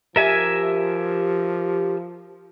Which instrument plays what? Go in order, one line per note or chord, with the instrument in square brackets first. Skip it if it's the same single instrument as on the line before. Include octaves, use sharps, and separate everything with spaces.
[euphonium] F3 [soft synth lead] G4 [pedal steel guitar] A#4 E5 G#5